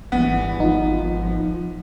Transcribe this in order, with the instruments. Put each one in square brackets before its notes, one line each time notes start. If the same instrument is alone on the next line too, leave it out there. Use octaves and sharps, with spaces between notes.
[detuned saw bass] G#1 [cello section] E3 G3 [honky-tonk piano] B3
[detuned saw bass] G#1 [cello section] F3 [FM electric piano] D#4 F4